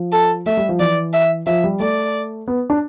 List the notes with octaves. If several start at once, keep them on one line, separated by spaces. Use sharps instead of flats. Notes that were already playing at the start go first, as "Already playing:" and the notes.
Already playing: F3
A4
A3 E5
G3
F3
E3 D5
E5
F3 E5
G3
A3 D5
B3
D4